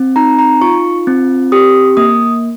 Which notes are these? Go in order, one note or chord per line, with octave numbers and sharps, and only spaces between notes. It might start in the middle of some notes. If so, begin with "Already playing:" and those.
Already playing: C4
D#4 A#5
A#5
F4 C#6
C4
G4 D#6
A#3 D#6